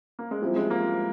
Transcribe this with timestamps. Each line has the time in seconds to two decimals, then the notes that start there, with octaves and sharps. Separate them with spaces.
0.19 A#3
0.31 G#3
0.42 F3 G3 C4 E4
0.56 G#3
0.70 A#3